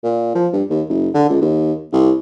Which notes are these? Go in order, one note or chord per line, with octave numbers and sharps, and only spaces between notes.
A#2
F3
G2
D#2
F#1
D3
C#2
D#2
C2